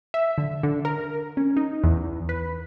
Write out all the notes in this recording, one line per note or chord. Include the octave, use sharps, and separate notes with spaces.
E5
D3
D3
A#4
C#4
D#4
E2
B4